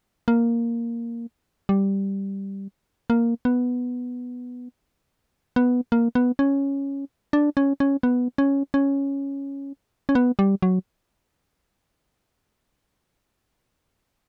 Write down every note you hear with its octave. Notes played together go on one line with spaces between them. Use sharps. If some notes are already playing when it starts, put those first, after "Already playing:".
A#3
G3
A#3
B3
B3
A#3
B3
C#4
D4
C#4
C#4
B3
C#4
C#4
C#4
B3
G3
F#3